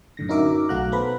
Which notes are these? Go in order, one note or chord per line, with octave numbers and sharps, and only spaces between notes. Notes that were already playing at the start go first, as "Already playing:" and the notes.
F#2 A2 D3 A#6
C#4 D#4 F#4 A#4 E5 D6
B1 A3 F#4 F5 A#5 F#6
B3 A4 B4 C5 B5